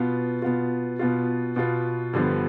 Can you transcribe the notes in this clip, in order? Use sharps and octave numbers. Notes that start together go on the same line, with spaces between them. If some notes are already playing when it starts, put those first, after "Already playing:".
Already playing: B2 B3 F4
B2 B3 F4
B2 B3 F4
B2 B3 F4
G2 D3 F3 B3